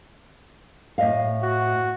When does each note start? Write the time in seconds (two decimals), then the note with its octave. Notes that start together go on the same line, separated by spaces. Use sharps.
0.98 A2 D#5 F5
1.43 F#4